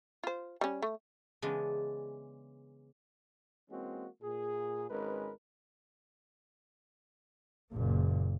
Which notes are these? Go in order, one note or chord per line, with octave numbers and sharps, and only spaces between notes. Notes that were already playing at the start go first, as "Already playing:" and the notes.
F4 C5
G3 C#4
A3
C#3 E3 G#3 B3 D4
E3 G#3 A#3 C4 C#4 F#4
A#2 G#4
G#1 G#3 C#4 A#4 B4
F#1 A#2